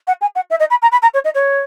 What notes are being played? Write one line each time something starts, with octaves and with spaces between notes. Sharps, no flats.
F#5
G#5
F#5
E5
D#5
B5
A#5
B5
A#5
C#5
D#5
C#5